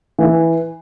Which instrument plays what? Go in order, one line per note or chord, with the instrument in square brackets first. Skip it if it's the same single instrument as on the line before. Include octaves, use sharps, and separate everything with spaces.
[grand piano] E3